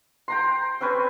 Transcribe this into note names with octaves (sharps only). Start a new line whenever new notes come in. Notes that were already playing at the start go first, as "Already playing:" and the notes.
G5 A#5 C6
C4 C#4 B4 C#5